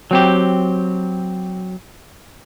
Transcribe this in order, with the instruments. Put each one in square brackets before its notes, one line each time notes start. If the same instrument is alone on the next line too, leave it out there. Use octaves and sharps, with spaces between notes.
[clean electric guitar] F#3 C4 G4